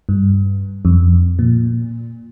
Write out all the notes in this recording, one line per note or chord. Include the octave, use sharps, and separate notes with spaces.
G2
F2
A#2